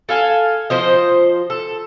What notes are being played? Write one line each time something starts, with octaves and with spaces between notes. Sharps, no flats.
A4 F5 G#5
F3 C5 D#5
A4